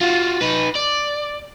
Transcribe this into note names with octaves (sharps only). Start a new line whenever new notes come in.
F4 F#4
D#4 B4
D5